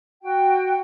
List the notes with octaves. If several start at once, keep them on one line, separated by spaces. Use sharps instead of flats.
F#4 G5